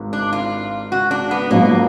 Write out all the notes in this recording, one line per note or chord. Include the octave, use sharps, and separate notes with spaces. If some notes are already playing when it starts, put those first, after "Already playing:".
Already playing: G#1 G#2
D4
F4
F#4
D4
B3
A#1 G#2 F#3 A#3 B3